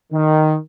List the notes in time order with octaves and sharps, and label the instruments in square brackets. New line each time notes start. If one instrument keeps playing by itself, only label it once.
[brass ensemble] D#3